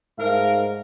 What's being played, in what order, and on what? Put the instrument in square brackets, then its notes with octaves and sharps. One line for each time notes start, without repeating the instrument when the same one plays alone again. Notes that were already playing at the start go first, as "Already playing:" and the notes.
[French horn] G#2 [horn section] A3 A#4 [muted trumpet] F5